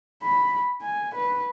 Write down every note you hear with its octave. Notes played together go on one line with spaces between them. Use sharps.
B5
G#5
B4